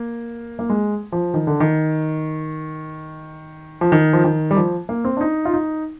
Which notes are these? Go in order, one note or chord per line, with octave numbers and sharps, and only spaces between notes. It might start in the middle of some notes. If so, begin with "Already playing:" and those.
Already playing: A#3
A#3
G#3
F3
D#3
D3
D#3
F3
D#3
F3
D#3
G3
F3
A#3
C4
D4
D#4
F4
D#4